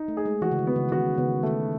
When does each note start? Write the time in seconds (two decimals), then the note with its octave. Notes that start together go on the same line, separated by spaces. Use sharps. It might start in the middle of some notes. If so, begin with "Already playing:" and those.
Already playing: D#4
0.08 A3
0.17 G#4
0.26 G#3
0.42 E3 F#4
0.52 C#3
0.59 D#3
0.67 B3
0.76 C#3
0.92 D#3 F#4
1.18 C#3 B3
1.43 D#3 A3